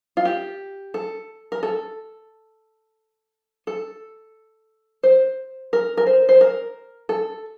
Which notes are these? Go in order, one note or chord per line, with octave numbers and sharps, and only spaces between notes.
F4
G4
A4
A#4
A4
A4
C5
A#4
A#4
C5
C5
A#4
A4